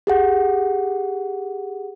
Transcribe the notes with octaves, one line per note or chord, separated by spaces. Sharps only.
G4 G#4 F#5